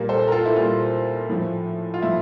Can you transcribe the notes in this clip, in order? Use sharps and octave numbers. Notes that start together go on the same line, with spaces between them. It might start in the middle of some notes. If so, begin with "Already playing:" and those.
Already playing: A#2 G3 A#3
A4 C5
A#4
F4 A4
E4
A#2 G3 A#3 F4
A2 F3 A3
F4
A2 F3 A3 E4